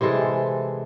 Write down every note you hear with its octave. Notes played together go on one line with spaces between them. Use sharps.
C3 E3 G#3 A4